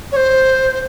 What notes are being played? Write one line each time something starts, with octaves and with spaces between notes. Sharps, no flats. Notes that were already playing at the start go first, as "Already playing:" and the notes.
C#5
C5